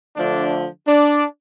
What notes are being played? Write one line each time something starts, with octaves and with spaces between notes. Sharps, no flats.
D3 F3 A3 D4
D4